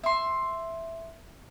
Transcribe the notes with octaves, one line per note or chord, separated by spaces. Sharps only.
E5 C6